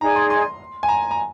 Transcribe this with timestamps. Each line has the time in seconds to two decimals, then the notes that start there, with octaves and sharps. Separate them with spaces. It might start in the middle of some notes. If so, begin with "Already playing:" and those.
0.01 D#4 G#4 D5 G#5 A#5
0.16 C6
0.30 C6
0.83 G#5
0.88 A#5
1.11 A#5